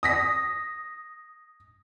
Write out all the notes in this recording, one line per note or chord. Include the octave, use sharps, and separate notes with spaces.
D#6 A#6 B6